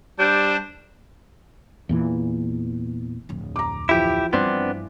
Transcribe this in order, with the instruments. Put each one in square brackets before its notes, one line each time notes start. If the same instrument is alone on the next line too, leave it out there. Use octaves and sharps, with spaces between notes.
[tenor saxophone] G3 [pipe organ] D4 C5
[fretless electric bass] E2 A#2 E3
[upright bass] D1 F2
[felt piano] A#5 D6
[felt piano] E3 F3 [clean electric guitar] E4 G4
[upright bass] G2 [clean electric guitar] B3 C4 D4